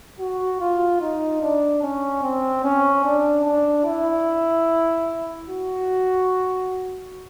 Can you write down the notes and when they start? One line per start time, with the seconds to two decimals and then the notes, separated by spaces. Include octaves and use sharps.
0.19 F#4
0.60 F4
1.01 D#4
1.42 D4
1.82 C#4
2.23 C4
2.64 C#4
3.04 D4
3.45 D4
3.86 E4
5.48 F#4